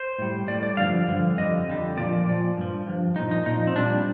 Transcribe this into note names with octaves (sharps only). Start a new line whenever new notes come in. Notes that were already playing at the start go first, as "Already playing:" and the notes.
Already playing: C5
A2 G3
A2 G3 D5
D5
G2 D3 F3 F5
G2 D3 F3
F2 D3 G3 D#5
F2 D3 G3
A#2 F3 D5
A#2 F3
G2 F3
G2 F3
A#2 F3 D#4
D#4
A#2 F3 D#4
C4
A#2 G3 D4